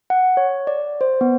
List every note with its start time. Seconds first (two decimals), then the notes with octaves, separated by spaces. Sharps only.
0.10 F#5
0.37 C#5
0.67 D5
1.01 C5
1.21 B3